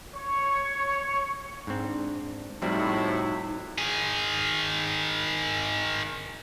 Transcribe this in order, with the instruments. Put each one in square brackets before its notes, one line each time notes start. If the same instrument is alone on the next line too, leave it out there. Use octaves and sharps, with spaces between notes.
[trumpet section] C#5
[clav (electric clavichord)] G#2 C4 [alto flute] D4
[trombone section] A2 [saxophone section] C3 E4 F#4 [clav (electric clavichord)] F3 G3 C4 [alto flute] D#4
[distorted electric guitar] D#3 G#4